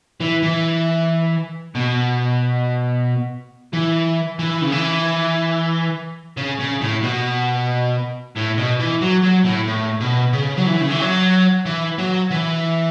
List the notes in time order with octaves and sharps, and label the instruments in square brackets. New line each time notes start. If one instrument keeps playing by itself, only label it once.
[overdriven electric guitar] E3
E3
B2
E3
E3
C#3
E3
C#3
C#3
A2
B2
A2
B2
E3
F#3
F#3
A2
A2
B2
C#3
F#3
E3
C#3
E3
F#3
E3
F#3
E3